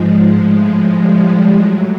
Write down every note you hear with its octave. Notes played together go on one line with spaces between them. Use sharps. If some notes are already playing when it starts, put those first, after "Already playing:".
Already playing: G#2 F3 G#3
A2 F3 G#3
G3
A2 F#3 G#3